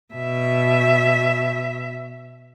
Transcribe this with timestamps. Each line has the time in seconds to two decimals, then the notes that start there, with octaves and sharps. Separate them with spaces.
0.14 B2 E5